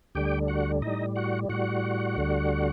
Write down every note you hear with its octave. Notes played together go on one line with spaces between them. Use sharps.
D2 D3 G3 G4 G5
F#4 F#5
A2 G3 D#4 D#5
F#4 F#5
A2 G3 F#4 F#5
D2 D3 G3